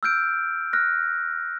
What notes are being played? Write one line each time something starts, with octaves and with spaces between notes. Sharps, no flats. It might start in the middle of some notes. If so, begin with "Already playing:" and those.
E6 F6 G6 D7
F6 F#6 A#6